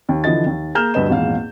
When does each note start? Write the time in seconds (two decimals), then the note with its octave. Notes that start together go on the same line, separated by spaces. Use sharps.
0.09 D#2
0.24 D3 E3 F3 D#5 A6
0.46 D#2
0.75 A#3 G#4 A#5 F6 G6 E7
0.94 D2 G2 B4 D#5 E7
1.09 G#1 E2 A#2 F5